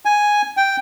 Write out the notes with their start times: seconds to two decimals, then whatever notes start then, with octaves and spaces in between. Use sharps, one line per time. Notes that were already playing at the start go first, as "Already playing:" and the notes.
0.05 G#5
0.57 G5